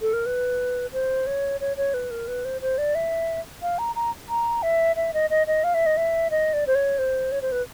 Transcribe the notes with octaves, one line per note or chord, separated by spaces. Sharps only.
A4
A#4
B4
C5
C#5
C#5
C#5
B4
A#4
B4
C5
C5
D5
E5
F5
A#5
A#5
A#5
E5
E5
D#5
D#5
D#5
F5
E5
D#5
E5
D#5
D5
C5
C#5
C5
C#5
C5
B4